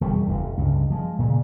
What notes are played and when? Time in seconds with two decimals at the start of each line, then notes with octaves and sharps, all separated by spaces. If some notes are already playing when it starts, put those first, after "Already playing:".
0.01 E1 C3 G3
0.27 F1 D#2
0.57 C#2 G2
0.90 F3 G#3
1.19 A#2 C#3